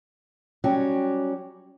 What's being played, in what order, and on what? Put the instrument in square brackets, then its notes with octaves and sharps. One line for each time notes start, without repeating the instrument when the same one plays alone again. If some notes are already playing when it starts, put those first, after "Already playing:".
[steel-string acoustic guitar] F#3 G3 C#4 F#4 G4